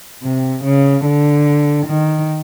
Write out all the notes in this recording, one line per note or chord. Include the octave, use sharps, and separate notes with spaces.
C3
C#3
D3
D#3